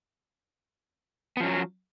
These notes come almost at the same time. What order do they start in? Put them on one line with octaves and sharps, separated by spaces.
B3 F3 C#4 F#3